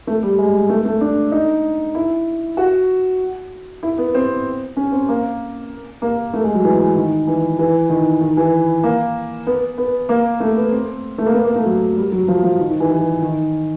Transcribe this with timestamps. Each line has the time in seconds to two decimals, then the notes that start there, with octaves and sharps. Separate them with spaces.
0.07 A3
0.23 G3
0.38 G#3
0.69 A3
0.85 A3
1.01 D4
1.32 D#4
1.95 E4
2.57 F#4
3.83 E4
3.98 B3
4.14 C4
4.77 C#4
4.92 C4
5.09 A#3
6.02 A#3
6.33 A3
6.44 G#3
6.55 F#3
6.64 E3
6.96 D#3
7.27 E3
7.59 E3
7.90 D#3
8.21 D#3
8.37 E3
8.83 A#3
9.47 B3
9.78 B3
10.09 A#3
10.40 A3
10.56 B3
10.72 C4
11.18 A3
11.26 A#3
11.34 B3
11.45 A#3
11.55 A3
11.65 F#3
11.97 G3
12.12 F#3
12.28 F3
12.44 F3
12.59 D#3
12.70 D#3
12.80 E3
12.91 E3
13.22 D#3